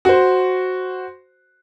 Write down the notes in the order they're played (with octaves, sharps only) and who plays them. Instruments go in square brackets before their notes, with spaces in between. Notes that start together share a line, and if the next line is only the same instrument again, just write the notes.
[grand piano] F#4 C5